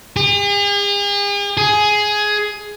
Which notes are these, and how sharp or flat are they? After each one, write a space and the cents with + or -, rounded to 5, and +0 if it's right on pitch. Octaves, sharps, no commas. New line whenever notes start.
G#4 -45
G#4 +10